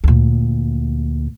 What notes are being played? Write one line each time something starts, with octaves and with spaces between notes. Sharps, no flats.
D2 A#2